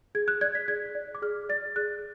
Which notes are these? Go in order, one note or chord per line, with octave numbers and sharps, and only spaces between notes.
G#4 G#6
F#6
D5 G#6
B6
G#4 G#6
D5
D6
G#4 F6
D5 A6
G#4 F#6